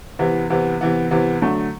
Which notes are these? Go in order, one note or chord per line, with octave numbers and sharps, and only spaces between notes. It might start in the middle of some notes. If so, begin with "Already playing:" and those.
C3 E3 B3
C3 E3 B3
C3 E3 B3
C3 E3 B3
D3 F#3 A3